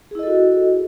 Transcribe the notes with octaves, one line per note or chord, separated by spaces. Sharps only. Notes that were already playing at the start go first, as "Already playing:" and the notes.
E4 F#4 G#4 A4 D#5